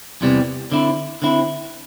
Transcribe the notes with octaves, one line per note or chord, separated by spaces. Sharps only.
E2 C3 E3 G3 C4
D3 C4 E4
D3 C4 E4